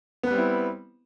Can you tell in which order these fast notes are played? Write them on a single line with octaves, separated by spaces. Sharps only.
B3 B4 G3 C4 E4